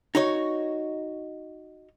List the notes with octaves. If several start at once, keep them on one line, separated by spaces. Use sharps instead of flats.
D#4 F#4 C#5